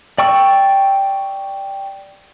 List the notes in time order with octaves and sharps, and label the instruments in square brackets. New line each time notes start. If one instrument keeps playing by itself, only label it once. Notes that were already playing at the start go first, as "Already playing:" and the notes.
[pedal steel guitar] D5 G5 C#6 E6